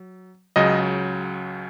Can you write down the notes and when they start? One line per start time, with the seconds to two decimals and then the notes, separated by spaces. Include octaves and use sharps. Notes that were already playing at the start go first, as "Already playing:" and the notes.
Already playing: F#3
0.56 C#2 C#3 F#3 D#5